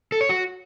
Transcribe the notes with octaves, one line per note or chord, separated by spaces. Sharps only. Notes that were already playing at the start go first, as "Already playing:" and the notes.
A4
C#5
F#4